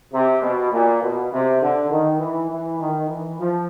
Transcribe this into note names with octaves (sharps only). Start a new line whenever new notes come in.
C3
B2
A#2
B2
C3
D3
D#3
E3
E3
D#3
E3
F3